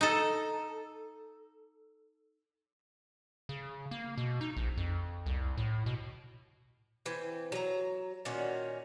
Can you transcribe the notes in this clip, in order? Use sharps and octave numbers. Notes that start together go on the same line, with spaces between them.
D#4 A4
C#3
A#3
B2
D#4
A#1
F2
C2
A2
B2
E3 C4
F#3 A#5
A#2 D#3 C#4 F#4